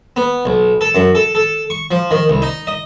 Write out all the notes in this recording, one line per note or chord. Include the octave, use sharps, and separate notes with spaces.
B3
B1
A4
F#2
A4
A4
C#6
F3
D#3
C2
D#4
D#5